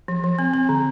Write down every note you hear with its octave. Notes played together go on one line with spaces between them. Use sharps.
F3
F3
C4
C4
D3